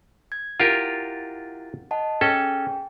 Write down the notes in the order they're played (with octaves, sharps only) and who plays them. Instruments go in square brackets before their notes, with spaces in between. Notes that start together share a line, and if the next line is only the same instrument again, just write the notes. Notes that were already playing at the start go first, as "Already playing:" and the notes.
[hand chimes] G#6
[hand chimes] E4 F#5 A6 [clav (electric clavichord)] F4 G4 A#4
[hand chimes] D#5 F#5 A5
[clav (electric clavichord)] C#4 A4 [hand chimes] G#4 G5